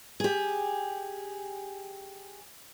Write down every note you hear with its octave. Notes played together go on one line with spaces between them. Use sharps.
G4 G#4